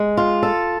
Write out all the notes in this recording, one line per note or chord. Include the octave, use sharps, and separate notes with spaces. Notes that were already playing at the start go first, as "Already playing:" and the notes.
Already playing: G#3
F4
A4